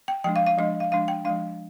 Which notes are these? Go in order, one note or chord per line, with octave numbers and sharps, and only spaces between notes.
G5
F3 G#3 D4 G5
F5
F5
F3 G#3 D4 D#5
F5
F3 G#3 D4 F5
G5
F3 G#3 D4 F5